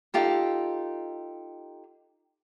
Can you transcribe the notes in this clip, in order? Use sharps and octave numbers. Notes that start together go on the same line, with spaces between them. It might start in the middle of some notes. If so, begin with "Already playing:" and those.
D#4 F4 G4 A4